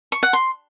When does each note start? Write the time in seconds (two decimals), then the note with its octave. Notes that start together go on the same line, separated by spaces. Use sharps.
0.12 C#6
0.23 F#5
0.33 C6